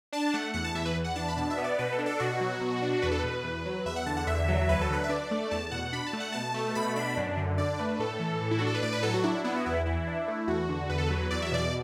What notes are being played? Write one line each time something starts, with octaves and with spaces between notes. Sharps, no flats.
D4 A5
A3 F#5
E2 F#5
A5
E3 E5
B4
E2
F#5
D4 A5
B5
B2 A5
E5
B3
D5
B2 B4
A4
D4
A4
B2 F#4
F#3
B2
D4
E2 B4
A4
B2 B4
E2
F#3
E2 E5
F#5
D3 A5
F#5
E2 E5
F#3
D2 B4
A4
D3 B4
E5
D4 D5
A3
E2 A5
B2 F#5
D4 B5
A5
A3
F#5
B2 A5
A3
B2 B5
D4 B5
F#2
D3
D4 D5
A3 B4
A2 A4
E3
A2
E4
D4 F#4
A4
B4
A2 D5
B4
F#3 A4
F#4
D4 E4
B3 E4
F#4
E2 E4
E3 E4
D4
A3
E2 F#4
D3
E2 B4
A4
F#3 B4
E2 D5
E5
B2 D5